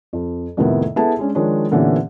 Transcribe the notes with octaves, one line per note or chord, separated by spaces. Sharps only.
F2
F2 A2 C3 D#3 B3 E4
B3 E4 G#4 A4 A5
G#3 C#4 D4
D#3 F3 G#3 D4 C#5
A#2 D3 E3 B3 C#4 G4